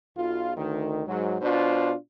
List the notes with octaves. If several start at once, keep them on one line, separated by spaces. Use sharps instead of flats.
B1 F4
D2 D#3
G#2 F#3
B2 D4 F4 C5